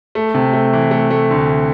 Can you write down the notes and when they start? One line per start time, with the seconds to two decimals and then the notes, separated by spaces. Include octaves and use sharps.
0.15 A3
0.34 C3
0.53 A3
0.73 E3
0.91 A3
1.11 A3
1.31 D2